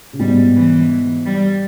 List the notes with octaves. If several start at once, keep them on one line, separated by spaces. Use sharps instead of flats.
C#3
G#2 B2 G3
E3
G3